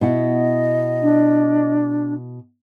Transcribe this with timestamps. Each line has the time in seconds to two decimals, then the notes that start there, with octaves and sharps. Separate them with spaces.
0.01 B2 E4 D#5 F#5
1.02 D4